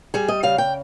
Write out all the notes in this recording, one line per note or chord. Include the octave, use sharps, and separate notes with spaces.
G3 G#4
D#5
C#3 F5
G5